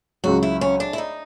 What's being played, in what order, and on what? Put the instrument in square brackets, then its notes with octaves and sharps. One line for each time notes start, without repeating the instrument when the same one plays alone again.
[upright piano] C#2 C#3 F#3 [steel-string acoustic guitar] F#4
[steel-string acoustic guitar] E4
C#4
D4
E4
D#4